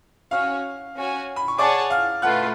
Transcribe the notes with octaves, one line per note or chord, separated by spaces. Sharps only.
C#4 F#4 C#5 F5 F6
C#4 F#4 C#5 G#5
B5
C#6
G#4 C#5 D5 F#5 A5 D6
F5 F6
A3 F4 B4 F#5 F#6